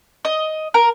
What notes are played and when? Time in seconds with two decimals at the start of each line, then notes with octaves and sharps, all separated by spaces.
0.25 D#5
0.74 A#4